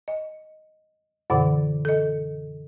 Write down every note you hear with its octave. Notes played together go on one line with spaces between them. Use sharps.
D#5
F#2 B2 D3 E3
A4 D#5